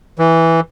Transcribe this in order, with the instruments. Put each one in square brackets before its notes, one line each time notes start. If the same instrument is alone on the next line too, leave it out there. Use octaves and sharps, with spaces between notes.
[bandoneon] E3